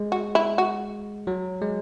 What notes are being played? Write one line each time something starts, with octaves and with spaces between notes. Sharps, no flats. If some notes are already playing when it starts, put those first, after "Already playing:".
Already playing: G#3
F#4
E4
F#4
F#3
G#3